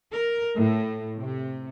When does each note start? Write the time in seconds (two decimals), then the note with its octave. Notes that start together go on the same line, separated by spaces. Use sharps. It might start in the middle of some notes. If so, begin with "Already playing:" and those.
0.12 A#4
0.58 A2
1.20 C3